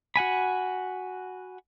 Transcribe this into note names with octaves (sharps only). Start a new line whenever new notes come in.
F#4 F#5 G#5 B5